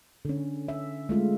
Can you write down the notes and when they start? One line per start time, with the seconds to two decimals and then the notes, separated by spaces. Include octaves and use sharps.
0.25 D3 C#4
0.68 E5
1.09 G#3 A3 F4